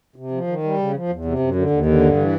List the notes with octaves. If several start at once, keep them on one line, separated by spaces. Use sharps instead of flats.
C3
F3
D#3
G3
C#3
F3
E2
C3
F#2
D3
D#2
D3
G2
E3